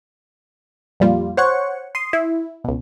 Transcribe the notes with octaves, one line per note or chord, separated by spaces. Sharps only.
F2 A#2 G3 F4
C5 C#5 F#5 C#6
C6 D#6
E4
C#2 B2